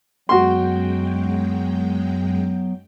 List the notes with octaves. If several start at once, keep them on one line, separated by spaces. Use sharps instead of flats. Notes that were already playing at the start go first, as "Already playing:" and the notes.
F#2 F#3 G#3 B3 F#4 G5 C6